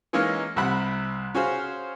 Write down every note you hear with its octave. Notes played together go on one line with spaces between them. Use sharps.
E3 G#3 A#3 C#4 D#4 F6
C2 C3 F#5 B5 F#6
C#4 F#4 G#4 C5 F5